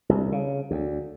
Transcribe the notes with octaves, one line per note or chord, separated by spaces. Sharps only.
C2
C#3
D2